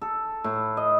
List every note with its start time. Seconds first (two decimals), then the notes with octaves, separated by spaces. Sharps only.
0.01 A4
0.44 A2
0.77 D#5